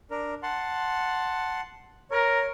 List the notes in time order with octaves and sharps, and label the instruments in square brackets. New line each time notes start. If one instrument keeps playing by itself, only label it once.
[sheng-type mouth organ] D4 A#4
F#5 A5 C6
[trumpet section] A#4 [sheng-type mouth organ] C#5